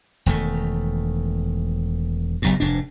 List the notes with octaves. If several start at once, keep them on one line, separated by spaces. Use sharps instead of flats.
E1 D#3 A3
F#1 B1 G2
F1 G#2 D4